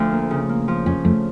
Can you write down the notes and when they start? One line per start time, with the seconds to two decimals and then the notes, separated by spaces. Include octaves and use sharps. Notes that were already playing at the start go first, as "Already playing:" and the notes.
Already playing: D2 F3
0.11 A#3
0.31 C#3
0.49 A#3
0.68 F3
0.86 F2 C#4
1.04 F2 A3